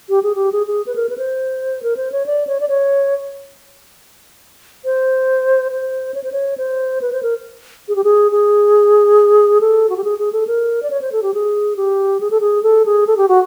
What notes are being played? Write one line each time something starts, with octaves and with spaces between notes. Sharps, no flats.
G4
G#4
G4
G#4
G#4
B4
A#4
B4
C5
A#4
C5
C#5
D5
C#5
D5
C#5
C5
C5
C#5
C5
C#5
C5
B4
C5
A#4
G#4
G4
G#4
G#4
A4
F#4
G4
G#4
G#4
A4
A#4
D5
C#5
C5
A4
G4
G#4
G4
G#4
A4
G#4
A4
G#4
A4
G4
F#4